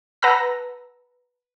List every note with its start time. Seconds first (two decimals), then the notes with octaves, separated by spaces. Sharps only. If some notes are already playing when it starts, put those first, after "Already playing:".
0.22 B4 F#5 A5 A#5 E6 A#6